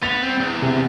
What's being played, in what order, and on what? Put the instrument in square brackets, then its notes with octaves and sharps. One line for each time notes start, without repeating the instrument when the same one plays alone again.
[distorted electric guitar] B3 [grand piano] A6 F7
[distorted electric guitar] C2 C4
E2
[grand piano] C3